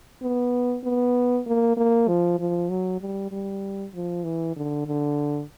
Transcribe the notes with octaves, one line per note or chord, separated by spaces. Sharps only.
B3
B3
A#3
A#3
F3
F3
F#3
G3
G3
F3
E3
D3
D3